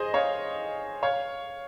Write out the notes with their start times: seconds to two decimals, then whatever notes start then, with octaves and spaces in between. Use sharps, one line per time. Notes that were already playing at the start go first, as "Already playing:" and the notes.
Already playing: G#4 C5 D#5
0.14 C#5 F5
1.03 C#5 F5